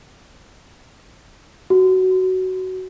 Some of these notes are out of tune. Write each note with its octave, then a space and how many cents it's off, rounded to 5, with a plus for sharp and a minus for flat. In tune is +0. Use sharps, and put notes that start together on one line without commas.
F#4 +15